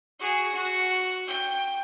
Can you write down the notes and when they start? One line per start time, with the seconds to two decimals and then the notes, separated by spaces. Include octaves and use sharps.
0.19 F#4 G#4
0.52 F#4
1.27 G5